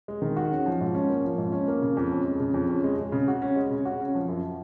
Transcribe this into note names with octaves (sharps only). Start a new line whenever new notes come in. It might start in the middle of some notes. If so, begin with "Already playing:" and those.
G#3
D#3
F#4
C#4
F3
G#2
C#4
A#3
F3
G#2
C#4
A#3
C#3
F2
C#4
G#3
C#3
F2
C#4
G#3
G#3
C#3
F#4
C#4
G#3
C#3
F#4
C#4
F3
F#2